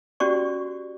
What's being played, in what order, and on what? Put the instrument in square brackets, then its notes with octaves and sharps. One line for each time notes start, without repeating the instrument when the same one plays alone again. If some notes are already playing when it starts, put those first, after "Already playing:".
[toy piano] C#4 F#4 G4 D5 C#6